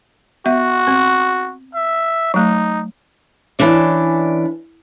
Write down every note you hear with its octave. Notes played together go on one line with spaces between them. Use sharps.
B3 F#4 E5
C4
E5
F#3 A3 D#4
E3 C#4 D4 D5